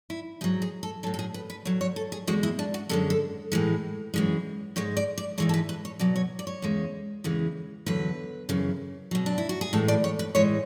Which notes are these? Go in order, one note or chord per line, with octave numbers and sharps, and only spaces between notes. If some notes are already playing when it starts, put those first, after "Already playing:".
E4
G#2 F#3 G#4
G#4
A4
A2 F#3 A4
A4
G#4
B4
B4
A2 F#3 C#5
C#5
A4
G#4
E2 B2 G#3 F#4
E4
D4
F#4
F#2 D3 G#3 A4
A4
A2 E3 G#3
F#2 E3 G#3
G#2 G#3 C#5
D5
D5
G#2 E3 G#3 C#5
A4
B4
B4
C#5
B2 F#3 D5
C#5
D5
C#5
E2 C#3 G#3
E2 C#3 E3 G#3
E2 D3 F#3 B4
F#2 C#3 E3
B2 F#3
D4
E4
F#4
G#4
A2 E3 G#3 A4
D5
C#5
B4
A2 E3 G#3 C#5